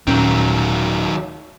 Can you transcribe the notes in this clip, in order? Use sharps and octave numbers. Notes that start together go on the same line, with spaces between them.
D#1 D#3 F#3 C#4